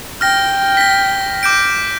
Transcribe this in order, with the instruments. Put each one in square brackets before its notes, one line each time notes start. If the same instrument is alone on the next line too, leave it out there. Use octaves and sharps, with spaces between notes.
[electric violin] G5 [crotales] F6 A#6
[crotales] A#6 B6
D6 G6 D7